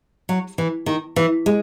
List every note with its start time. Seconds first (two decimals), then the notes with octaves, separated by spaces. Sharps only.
0.29 F#3
0.58 E3
0.86 D#3
1.16 E3
1.46 G#3